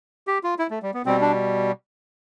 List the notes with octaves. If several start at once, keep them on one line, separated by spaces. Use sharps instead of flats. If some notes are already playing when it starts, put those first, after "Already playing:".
G4
F4
E4
A3
G3
B3
B2 G3 C4
D4